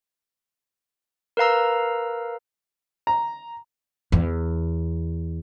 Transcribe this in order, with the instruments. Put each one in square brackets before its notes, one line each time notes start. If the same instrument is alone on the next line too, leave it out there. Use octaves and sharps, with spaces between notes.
[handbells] A#4 B4 F5 A#5 E6
[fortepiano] A#5
[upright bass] E2